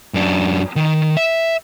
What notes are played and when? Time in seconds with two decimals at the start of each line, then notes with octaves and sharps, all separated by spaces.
0.14 F#2 D4
0.76 D#3
1.17 E5